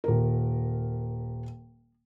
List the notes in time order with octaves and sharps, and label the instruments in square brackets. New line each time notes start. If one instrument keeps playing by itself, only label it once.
[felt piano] D#1 A#4